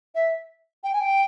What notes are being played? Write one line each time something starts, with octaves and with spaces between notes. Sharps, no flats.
E5
G5
G#5
G5